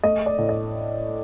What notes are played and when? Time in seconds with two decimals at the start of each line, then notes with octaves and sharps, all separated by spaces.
0.03 A3 D#5
0.26 D5
0.38 A2
0.49 D#5